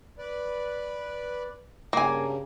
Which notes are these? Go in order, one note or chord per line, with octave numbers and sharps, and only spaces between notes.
B4 D5
G2 C#3 A#3 G#5